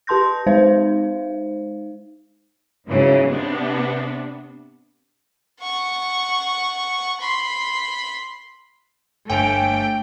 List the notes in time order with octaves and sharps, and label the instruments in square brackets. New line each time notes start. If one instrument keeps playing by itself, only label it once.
[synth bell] G4 B4 A5 C6 G6 A#6
G#3 D#4 C5 F5
[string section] G#2 C#3 E3 F#3
C3 B3 D4
[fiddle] F#5 C#6
B5 C6
[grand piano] G1 G#5 F7 [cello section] A3 [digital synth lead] G5